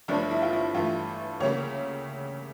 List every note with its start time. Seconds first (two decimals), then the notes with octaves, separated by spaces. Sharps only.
0.08 G1 G2 F3 A3 D4
0.31 E4
0.42 F4
0.53 E4
0.75 G2 E3 A3 F4
1.40 D2 C#3 G3 A#3 C#5